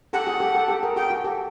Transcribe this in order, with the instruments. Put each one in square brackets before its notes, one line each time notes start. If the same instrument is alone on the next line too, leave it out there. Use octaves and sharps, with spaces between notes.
[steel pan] G4 A4 [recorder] F#5
[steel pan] F#4 G#4
G4 A4
G4 A4
G4 A4
G#4 A#4
[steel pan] F#4 G#4 [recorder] G5
[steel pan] F#4
G4 A4